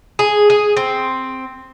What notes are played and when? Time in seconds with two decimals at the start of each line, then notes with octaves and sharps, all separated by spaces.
0.19 G#4
0.50 G#4
0.77 C4